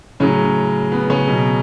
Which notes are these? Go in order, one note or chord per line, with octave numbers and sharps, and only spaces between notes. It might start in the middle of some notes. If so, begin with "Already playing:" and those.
A2 C#3 F#3 C#4
B3
C#3 C#4
B2 F#3